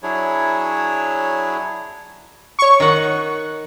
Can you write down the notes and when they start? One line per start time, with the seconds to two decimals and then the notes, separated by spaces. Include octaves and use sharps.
0.03 F#3 D4 E4 G#4 C#5
2.59 C#5 C#6
2.80 D#3 F#5